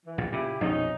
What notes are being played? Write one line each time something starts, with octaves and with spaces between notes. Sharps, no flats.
E3
A#1 A#2
A#2 C#3 E4 G4
A#1 F2 B2 C#4 D#4